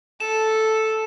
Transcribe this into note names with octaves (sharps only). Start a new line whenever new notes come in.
A4 E7